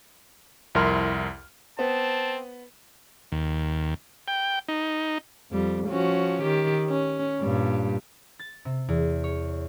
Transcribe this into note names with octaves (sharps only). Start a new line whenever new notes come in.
C2 F2 E4 A#4 C6 F6
B3 C4 C5 A5
D#2
G5
D#4
F2 G3
F3 C#4 F#4
D#3 G4
C#4
G2 A#2 G3
A6
C3
E2
C#5